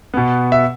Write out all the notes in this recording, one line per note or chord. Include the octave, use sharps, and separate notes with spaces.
B2 B3
E5